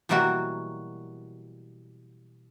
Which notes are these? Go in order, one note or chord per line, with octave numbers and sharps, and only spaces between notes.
B2 E3 F#3 G3 A#3 F#4